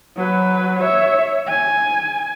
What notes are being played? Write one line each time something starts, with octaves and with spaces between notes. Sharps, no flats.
F#3 B4
C#5 E5
G#5